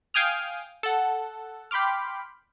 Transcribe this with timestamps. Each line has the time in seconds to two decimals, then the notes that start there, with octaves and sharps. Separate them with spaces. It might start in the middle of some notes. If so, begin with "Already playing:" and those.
0.14 F5 G5 G#5 D#6 F6
0.83 A4 F#5
1.71 G5 B5 C6 D6 F6